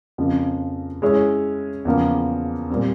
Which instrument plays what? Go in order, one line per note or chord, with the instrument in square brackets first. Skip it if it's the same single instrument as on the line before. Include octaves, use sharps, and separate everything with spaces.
[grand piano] F2 C#3 F3 A#3
G#3 C#4 E4 G#4 C#5
E2 C#3 F3 A#3
A#2 G3 C4